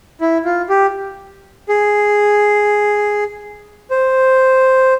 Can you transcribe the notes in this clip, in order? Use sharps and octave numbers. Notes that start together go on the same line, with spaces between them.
E4
F4
G4
G#4
C5